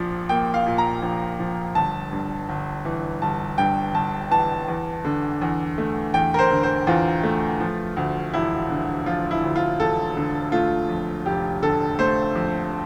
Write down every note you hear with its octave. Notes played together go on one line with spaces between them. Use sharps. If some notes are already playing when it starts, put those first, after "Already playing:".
Already playing: A#1 A#2 F3
A#3 G5
F5
A#2
A#5
A#1
F3
G1 A5
G2
G1
E3
G1 A5
G2 G5
G1 A5
E3 A5
E2
D3
E2
A3
E2 G5
A#4
C5
D3
C5
E2 F4
A3
F3
D2
E1 E4
D3
F3 F4
E4
D2
F4
E1 A4
D3
A3 F4
F2
F1 G4
D3 A4
A3 C5
F2